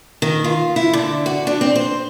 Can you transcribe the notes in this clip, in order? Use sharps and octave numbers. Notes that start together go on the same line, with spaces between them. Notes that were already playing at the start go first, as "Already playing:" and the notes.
D#3
F4
E4
D3
F#4
D4
C4
C5